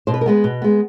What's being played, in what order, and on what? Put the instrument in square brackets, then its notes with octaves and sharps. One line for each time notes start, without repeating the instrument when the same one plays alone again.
[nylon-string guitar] B2 C5
B4
A#4
G#3 B3 B4
B2
G#3 B3